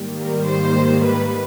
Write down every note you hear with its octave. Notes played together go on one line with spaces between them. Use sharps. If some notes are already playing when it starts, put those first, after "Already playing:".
Already playing: G#2 D#3 G3 A#3
A#4
C5
B4